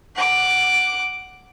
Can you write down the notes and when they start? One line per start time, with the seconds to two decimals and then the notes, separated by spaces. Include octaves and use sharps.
0.15 F#5 D6